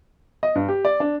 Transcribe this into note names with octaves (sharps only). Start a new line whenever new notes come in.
D#5
G2
G4
D5
D4